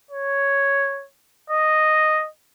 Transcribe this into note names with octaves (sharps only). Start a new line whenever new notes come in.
C#5
D#5